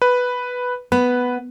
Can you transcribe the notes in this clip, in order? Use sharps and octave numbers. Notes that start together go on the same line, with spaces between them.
B4
B3 B4